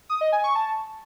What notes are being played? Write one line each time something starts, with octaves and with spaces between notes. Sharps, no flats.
D#6
D#5
G#5
C#6
A5